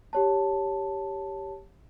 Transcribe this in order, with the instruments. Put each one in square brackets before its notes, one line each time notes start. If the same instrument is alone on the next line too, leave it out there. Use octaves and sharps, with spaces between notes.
[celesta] G4 C#5 A5